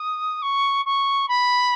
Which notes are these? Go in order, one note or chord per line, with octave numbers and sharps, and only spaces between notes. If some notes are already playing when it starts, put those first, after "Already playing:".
Already playing: D#6
C#6
C#6
B5